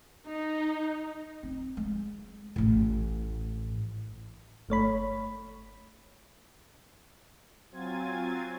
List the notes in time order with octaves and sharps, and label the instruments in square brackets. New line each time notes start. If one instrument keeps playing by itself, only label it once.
[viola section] D#4
[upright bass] C4
G#3
A1 A2
[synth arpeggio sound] G1 A3 C#5 B5
[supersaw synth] F#3 C4 F4 G#5 G#6 A6